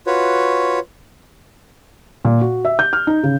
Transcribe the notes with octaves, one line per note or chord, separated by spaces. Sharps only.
F4 F#4 B4 C#5
A#2
F#4
E5
G6
F6
D#4
C#3